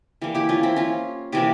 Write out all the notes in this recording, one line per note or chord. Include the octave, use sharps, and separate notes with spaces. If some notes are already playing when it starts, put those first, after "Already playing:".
E3 G3 A#3
E4 G4
C#4 F4
C4 E4
C#4 F4
C3 E3 G3 A#3 E4 G4